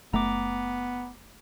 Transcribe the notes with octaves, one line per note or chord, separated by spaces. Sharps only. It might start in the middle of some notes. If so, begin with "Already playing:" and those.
F#1 A3 B3 A#5 D6